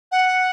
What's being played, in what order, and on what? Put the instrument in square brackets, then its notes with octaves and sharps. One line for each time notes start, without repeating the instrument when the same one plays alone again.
[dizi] F#5